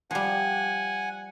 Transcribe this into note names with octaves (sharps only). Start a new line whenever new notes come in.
F3 G3 F#5 G#5